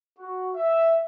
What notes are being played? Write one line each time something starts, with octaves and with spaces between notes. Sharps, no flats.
F#4
E5